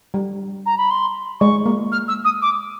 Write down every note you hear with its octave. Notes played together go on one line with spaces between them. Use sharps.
G3
A#5
B5
C6
G#3 C#6
A#3
F6
E6
D#6
D6